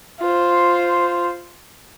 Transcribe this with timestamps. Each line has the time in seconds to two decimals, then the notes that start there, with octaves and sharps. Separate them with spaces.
0.20 F4 C5